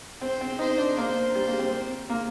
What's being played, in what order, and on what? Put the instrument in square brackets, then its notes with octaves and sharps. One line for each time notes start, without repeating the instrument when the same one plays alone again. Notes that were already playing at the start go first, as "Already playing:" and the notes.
[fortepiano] C4 [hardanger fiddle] C5
[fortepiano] C4
[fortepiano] D#4 [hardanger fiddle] C5
[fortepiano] D4
[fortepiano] A#3 [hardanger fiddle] C5
[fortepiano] G3
A#3
C4
A#3